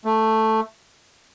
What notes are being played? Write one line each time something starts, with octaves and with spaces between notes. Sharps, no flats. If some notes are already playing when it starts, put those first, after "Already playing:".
A3